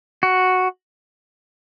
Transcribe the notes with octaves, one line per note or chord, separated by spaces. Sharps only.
F#4